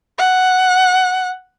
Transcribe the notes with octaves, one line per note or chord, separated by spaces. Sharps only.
F#5